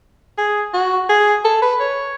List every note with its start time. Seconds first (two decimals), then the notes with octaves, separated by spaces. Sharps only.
0.38 G#4
0.74 F#4
1.10 G#4
1.45 A4
1.62 B4
1.81 C#5